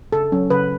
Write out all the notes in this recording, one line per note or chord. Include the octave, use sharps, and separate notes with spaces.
C#3 A4
F#3 C#4
C#3 B4